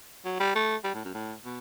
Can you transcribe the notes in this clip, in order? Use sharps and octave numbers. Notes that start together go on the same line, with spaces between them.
F#3
G3
A3
G3
A2
F#2
A2
B2